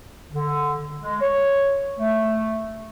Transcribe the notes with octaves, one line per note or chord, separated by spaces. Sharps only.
D3
G#3
C#5
A3